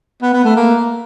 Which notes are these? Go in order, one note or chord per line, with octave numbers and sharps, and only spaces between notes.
B3
B3
A3
A#3